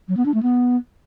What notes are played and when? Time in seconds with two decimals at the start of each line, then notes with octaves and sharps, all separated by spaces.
0.09 F#3
0.17 B3
0.26 D4
0.34 A3
0.43 B3